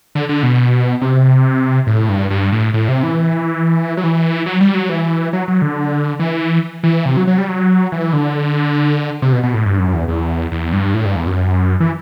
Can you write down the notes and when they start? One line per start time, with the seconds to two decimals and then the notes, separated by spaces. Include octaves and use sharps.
0.15 D3
0.29 D3
0.43 B2
1.01 C3
1.87 A2
2.09 G2
2.30 G2
2.52 A2
2.74 A2
2.88 C3
3.03 E3
3.97 F#3
4.04 E3
4.46 F#3
4.61 G3
4.75 F#3
4.89 E3
5.33 F#3
5.48 F#3
5.62 D3
6.19 E3
6.83 E3
7.06 C3
7.17 F#3
7.27 F#3
7.38 G3
7.49 F#3
7.92 E3
8.13 D3
9.22 C3
9.33 B2
9.43 B2
9.54 A2
9.65 G2
9.79 F#2
9.93 E2
10.08 E2
10.52 E2
10.73 G2
10.94 A2
11.05 G2
11.16 E2
11.27 F#2
11.80 E3